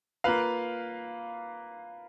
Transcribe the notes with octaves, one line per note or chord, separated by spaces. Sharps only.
A#3 F4 B4 F5